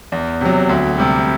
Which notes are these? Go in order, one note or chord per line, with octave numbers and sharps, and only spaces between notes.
E2
C3 F#3
D2
C3 G3